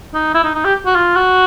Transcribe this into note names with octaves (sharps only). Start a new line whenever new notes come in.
D#4
E4
D#4
D#4
G4
F#4
F4
F#4